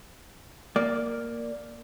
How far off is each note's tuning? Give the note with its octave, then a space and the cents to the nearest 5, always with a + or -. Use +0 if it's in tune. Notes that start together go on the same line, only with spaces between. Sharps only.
A#3 +0 D5 +0